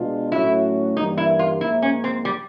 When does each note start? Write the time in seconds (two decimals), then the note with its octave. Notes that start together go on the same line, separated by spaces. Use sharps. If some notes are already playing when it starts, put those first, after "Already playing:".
Already playing: B2 G#3 B3 D4 F4
0.32 A2 F#3 A3 C#4 E4 F#4
0.97 G2 E3 G3 A#3 D#4
1.18 E4
1.39 F4
1.61 G#2 F3 A#3 E4
1.82 C#4
2.04 C4
2.25 G3